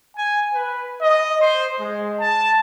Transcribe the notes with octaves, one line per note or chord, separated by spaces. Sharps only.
G#5
B4
D#5
C5
G#3
A5